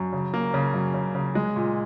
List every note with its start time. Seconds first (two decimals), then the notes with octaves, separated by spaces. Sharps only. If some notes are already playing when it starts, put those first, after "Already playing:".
Already playing: F#2
0.13 C#3
0.34 A#3
0.54 C#3
0.74 F#2
0.94 C#3
1.15 C#3
1.35 G#3
1.56 A#2